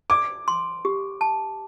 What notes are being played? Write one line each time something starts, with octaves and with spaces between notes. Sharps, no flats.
D5 D6
C6
G4
A5